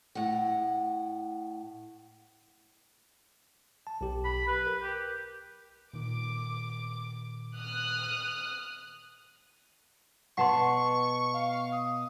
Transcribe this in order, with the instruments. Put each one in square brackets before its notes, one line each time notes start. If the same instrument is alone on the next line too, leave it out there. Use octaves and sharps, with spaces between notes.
[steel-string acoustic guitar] A2 F#5
[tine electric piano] A5
B1 G4
[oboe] B5
B4
[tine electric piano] A#4
[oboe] G4
[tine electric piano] A#2 D#3 [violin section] D6
[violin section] D#6 F6 F#6
[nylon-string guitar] B2 B3 A5 [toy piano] F#5 C6 [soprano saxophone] C#6
[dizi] F5
D#6